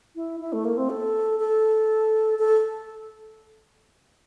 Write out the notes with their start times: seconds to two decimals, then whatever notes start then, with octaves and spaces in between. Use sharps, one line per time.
0.16 E4
0.40 E4
0.53 A3
0.65 A#3
0.77 C4
0.90 A4
1.39 A4
2.39 A4